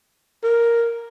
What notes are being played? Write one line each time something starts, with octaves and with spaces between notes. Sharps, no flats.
A#4